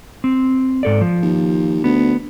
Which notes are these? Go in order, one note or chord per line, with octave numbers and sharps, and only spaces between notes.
C4
G#2 A4 D5
F3
D#2
D2 B3